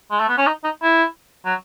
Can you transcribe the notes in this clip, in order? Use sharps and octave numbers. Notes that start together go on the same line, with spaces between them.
G#3
A3
B3
C#4
D#4
D#4
E4
F#3